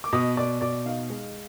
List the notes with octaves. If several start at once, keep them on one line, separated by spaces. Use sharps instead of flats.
D6
B2 D#5 D#6
B2 D5 D6
B2 D5 D6
D#4 F5
G#3